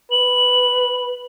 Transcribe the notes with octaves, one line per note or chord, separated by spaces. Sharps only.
B4 F#7